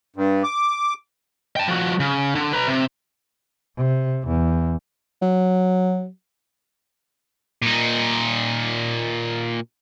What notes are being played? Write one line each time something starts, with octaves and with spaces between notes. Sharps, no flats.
G2
D6
G5 A5
F3 F#4
C#3
D3
B4 A#5
C3
C3
E2
F#3
A#2 D#4